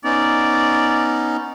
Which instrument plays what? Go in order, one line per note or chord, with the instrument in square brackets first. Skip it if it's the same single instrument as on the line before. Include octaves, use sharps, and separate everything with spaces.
[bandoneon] B3 C#4 D#4 [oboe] D5